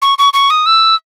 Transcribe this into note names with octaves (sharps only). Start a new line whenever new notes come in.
C#6
C#6
C#6
D#6
E6